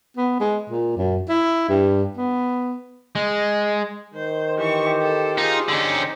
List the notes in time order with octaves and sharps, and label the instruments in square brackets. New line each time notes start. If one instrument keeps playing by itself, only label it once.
[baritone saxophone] B3
G#3
A#2
F#2
E4
G2
B3
[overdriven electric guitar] G#3
[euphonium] D#3 [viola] C5
[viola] E3 C#6 [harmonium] G4 C5
[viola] A4
[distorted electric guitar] D#4 [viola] F4 G#4
[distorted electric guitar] D3 C#4 [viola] D#4